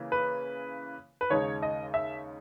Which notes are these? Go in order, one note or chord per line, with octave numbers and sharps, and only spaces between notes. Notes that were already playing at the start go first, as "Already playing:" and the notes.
Already playing: C#3 E3 A#3
B4
B4
D#2 C#3 G#3 D#4 C#5
D#5
E5